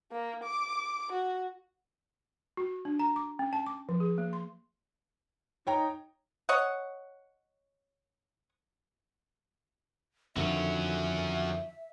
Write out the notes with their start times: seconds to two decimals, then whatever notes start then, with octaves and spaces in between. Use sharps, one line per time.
0.12 A#3
0.44 D6
1.12 F#4
2.57 F#4
2.85 D4
2.99 A#5
3.16 D6
3.39 C#4
3.53 A5
3.66 D6
3.89 F3
4.00 G#4
4.18 A#3
4.33 C6
5.67 D#4 C#5 G5 A#5
6.49 C#5 D#5 F#5
10.36 F2 D3 D#3 F#3 C#4 E5